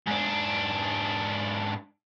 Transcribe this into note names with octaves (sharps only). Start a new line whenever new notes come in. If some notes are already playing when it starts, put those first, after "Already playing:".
G#2 D4